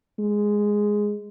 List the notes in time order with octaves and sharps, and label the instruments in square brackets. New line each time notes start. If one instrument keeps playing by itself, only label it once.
[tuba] G#3